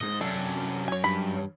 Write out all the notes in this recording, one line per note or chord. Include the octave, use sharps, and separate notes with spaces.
C2 G#2 D#5
F#2 C3 C#4 D4 A4
C#5 G#5
G2 B5